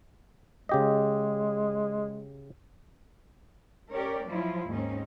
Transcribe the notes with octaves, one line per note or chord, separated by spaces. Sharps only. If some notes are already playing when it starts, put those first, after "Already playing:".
C#3 G#3 G4 D#5
C#4 G4 A#4 C#5 D5
F3 F#3 E4 F4
D#2 G#2 C4 C#4 D#4